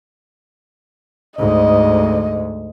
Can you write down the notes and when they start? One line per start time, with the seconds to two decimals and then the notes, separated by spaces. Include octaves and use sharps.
1.39 D2 G#2 D#5